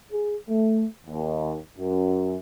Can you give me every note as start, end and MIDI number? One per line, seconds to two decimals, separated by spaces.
0.12 0.35 68
0.49 0.85 57
1.07 1.56 39
1.78 2.37 42